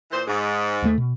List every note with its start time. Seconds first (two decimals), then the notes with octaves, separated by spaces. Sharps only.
0.11 A#2 E3 C5
0.27 G#2
0.82 D#2 G3 A3
0.98 B2